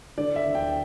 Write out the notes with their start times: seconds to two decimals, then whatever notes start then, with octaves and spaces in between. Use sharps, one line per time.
0.18 D3 D5
0.36 E5
0.46 D2
0.55 G5